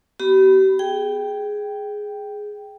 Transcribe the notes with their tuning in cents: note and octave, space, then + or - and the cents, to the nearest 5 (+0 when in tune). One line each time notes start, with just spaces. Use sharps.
B3 +10 G4 -40 B5 +0
G#4 +5 G5 +0